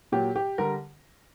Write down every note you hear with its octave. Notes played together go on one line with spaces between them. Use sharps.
A#2 F#3 G4
G4
D3 G3 A#4